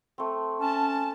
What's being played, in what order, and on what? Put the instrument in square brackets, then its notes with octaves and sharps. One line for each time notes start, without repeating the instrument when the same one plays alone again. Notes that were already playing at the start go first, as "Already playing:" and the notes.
[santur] A3 C4
[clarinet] C#4 [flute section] A5